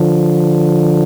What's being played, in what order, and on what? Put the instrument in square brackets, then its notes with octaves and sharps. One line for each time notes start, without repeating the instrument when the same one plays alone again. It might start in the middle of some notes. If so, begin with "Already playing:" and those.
Already playing: [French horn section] D3 F3